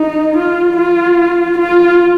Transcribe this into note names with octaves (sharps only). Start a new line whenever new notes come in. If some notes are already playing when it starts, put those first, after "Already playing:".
Already playing: D#4
F4
F4
F4